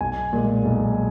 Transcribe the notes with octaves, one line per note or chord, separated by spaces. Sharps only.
B1 G#5
A#2 G#3
B1